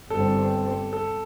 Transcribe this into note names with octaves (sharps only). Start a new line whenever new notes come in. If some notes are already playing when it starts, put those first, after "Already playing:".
G1 G2 G3 C4 A4
A4